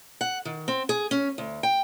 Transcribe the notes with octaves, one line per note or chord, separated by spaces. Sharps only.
F#5
D#3
C4
G#4
C#4
D2
G5